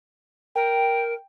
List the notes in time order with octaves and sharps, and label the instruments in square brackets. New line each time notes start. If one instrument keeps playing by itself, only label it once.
[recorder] A#4 [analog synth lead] G5